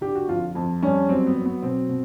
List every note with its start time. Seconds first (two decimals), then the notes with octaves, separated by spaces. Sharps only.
0.01 D3 G4
0.15 F#4
0.28 F2 F4
0.55 F2
0.83 G3 C#4
1.09 F#3 C4
1.26 B3
1.36 F#3
1.45 B3
1.62 B2 C4
1.89 B2